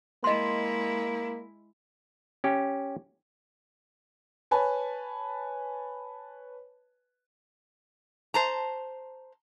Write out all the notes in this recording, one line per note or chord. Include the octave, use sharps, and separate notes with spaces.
G#3 A#3 E4 D#5 C6
C#4 G4
B4 C#5 G#5 A5 B5
C5 A5 A#5